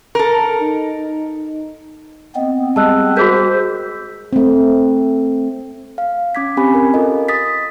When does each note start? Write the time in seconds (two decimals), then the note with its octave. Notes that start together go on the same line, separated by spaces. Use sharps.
0.15 A4 A#4
0.61 D#4
2.36 B3 C4 D#5
2.76 G3 G#3 D#5 A5 E6 F#6
3.17 F#4 G#4 A#4 C5 E6 G6 B6
4.33 A3 C4
5.98 F5
6.35 C#4 D6 G#6 B6
6.57 C4 C#4 G4 G#5 B5
6.75 A#4
6.94 F4 A4 A#4 D#5
7.28 D#6 A6 B6